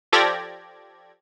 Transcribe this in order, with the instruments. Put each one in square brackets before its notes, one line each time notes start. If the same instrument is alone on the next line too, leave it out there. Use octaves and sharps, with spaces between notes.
[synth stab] F3 G4 A4 D5 G#6 A#6